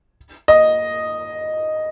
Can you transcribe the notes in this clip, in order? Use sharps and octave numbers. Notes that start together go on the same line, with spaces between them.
D#5